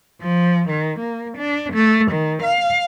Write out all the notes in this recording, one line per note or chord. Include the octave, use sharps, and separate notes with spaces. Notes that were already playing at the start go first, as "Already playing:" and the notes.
F3
D#3
A#3
D4
A3
D#3
F5